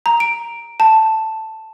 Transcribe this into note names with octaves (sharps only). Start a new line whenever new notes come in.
A#5
D7
A5